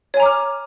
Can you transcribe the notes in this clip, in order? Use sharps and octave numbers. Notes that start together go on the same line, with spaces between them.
C#5 G#5 A#5 D6 F6